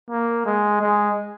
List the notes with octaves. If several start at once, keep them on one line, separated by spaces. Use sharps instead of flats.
A#3
G#3
G#3